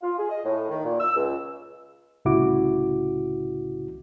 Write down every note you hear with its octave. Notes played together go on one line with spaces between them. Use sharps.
F4
G#4
D#5
A2
D#3
A#2
E6
C#2
C2 A2 C#3 E4 F#4 D6